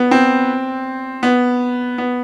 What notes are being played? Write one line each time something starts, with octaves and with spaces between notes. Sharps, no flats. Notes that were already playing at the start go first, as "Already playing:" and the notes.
Already playing: B3
C4
B3
B3